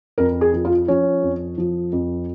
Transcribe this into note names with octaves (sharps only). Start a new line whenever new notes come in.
F2 A#4
G#4
F3
F4
F3 C#4
F2
F3
F2